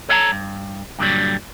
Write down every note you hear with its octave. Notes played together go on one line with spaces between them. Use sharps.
A4 C#5 E5 F#5 A5 A#5
G2
G2 A#2 D3 D#3 F#3 G3